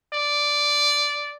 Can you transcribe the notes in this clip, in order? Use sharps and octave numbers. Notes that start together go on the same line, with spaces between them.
D5